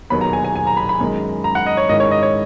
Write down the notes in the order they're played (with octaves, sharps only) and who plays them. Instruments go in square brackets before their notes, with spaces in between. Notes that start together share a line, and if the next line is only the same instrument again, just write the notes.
[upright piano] E1 D#2 D#3 F#3 B3 [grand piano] B5
[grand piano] A#5
G#5
G#5
G#5
A#5
B5
B5
[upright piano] F#2 D#3 G#3
[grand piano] A#5
F#5
D#5
C#5
[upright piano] G#2 D#3 G#3 C#4 E4 [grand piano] D#5
[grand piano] C#5
D#5
C#5